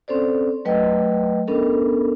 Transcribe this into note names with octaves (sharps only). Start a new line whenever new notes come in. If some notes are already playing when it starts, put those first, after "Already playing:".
C4 C#4 A4 C5 D5
F#3 A3 B4 D#5 G5
B3 C#4 D4 A4 A#4